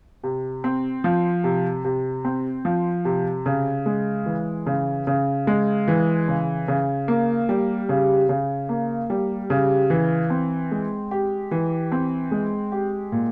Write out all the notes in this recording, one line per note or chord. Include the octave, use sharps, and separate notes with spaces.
C3
C4
F3
C3
C3
C4
F3
C3
C#3
G#3
E3
C#3
C#3
G#3
E3
C#3
C#3
A#3
G3
C#3
C#3
A#3
G3
C#3
E3
C4
G#3
G4
E3
C4
G#3
G4
A#2